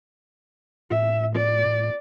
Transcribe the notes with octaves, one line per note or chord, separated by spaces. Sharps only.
A2 E5
D5
A2